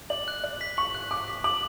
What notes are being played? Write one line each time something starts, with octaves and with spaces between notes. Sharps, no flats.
D5 F#7
F#6
D5 F#6
B6
C#6 F#7
F#6
D6 F#6
B6
D6 F#7